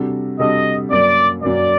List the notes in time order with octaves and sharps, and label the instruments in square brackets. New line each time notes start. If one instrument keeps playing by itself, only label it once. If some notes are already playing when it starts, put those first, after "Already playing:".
Already playing: [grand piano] C3 G3 D4 F#4 A4
[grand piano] C3 G3 D4 F#4 A4 [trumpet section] D#5
[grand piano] F#2 F#3 A#3 [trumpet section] D5
[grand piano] F#2 F#3 A#3 [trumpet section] D5